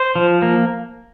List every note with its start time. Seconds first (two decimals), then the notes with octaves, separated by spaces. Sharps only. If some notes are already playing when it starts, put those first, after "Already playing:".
Already playing: C5
0.16 F3
0.42 A#3